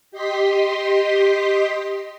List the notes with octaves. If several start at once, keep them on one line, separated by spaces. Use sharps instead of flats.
G4 D#5 C6 B6